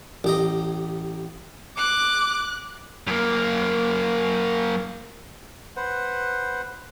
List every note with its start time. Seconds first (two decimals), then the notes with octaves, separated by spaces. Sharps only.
0.24 A1 G4 D#5
1.78 D6 F#6
3.07 F#2 A#3
5.76 B4 C5 F#5